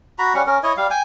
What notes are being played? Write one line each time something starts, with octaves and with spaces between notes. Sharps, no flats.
F#4 A#5 B5
G3 C#4 F#5
C#4 A#4
E4 C#5 D#5
G3 F5
G5 G#5